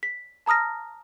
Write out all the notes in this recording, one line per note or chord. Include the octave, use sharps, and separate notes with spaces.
B6
A5 A#5 D#6 F6 A#6